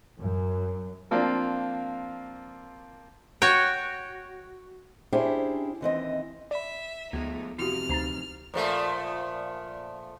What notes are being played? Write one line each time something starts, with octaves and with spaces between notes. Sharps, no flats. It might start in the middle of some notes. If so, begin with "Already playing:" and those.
F#2
F3 A#3 C4 D4 F4
F#4 C#5 G5
C#4 D4 E4 G4 G#4 C5
D#2 E3 C4 D#5
D5 E5 B5
D2 F3 G#3 A3 B3 D#4
F2 C3 E3 E4 F#4 G4 F6
D2 D#4 C5 A#5 A6
A#2 F3 A3